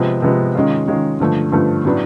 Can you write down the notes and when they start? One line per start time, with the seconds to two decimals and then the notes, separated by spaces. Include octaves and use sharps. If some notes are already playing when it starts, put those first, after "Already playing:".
Already playing: C3 F3 G#3 B3
0.22 C3 F3 G#3 B3
0.55 D#3 G#3 C#4 F4
0.88 D#3 G#3 C#4 F4
1.20 G2 D3 F3 A3
1.52 G2 D3 F3 A3
1.85 A2 F#3 B3 D4